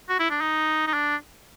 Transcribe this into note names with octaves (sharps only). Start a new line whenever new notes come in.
F#4
E4
D4
D#4
D#4
D4